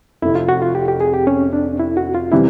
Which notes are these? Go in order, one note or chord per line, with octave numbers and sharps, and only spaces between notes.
F1 F2 C3 E4
F4
F#4
F4
G4
G4
G#4
G4
C#4
D4
E4
F#4
F4
C3 E3 G3 E4